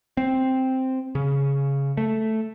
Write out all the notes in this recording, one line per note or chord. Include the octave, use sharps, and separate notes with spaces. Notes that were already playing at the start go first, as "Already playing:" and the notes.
C4
C#3
A3